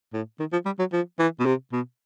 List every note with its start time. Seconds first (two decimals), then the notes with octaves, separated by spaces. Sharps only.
0.13 A2
0.40 D#3
0.53 F3
0.66 G3
0.79 F#3
0.92 F3
1.19 E3
1.40 B2
1.46 C3
1.72 B2